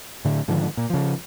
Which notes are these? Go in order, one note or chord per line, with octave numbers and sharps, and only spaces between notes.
A2 D3
G#2 D3 D#3 F3
A#2
C#3 F3